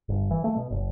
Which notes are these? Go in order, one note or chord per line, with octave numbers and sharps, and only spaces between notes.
G1
E3
A3
B2
F#1